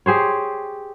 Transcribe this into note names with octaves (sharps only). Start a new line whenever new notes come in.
G4 G#4 C5 C#5